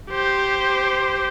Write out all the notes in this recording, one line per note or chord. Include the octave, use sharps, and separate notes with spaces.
G4 C5